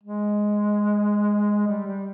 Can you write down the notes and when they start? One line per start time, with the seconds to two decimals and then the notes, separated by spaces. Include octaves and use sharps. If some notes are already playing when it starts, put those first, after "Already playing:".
0.04 G#3
1.67 G3
1.87 G3